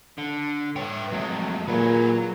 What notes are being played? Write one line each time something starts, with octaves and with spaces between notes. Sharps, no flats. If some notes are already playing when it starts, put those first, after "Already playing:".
D3
B4 C#5 E5 G5
F2 F#3 G#3 A3
A#2 F#3 G#4 B4